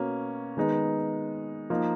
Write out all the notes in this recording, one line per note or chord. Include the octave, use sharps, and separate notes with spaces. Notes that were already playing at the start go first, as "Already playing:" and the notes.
Already playing: B2 A#3 C#4
D#3 G#3 B3 D#4
F3 A#3 D#4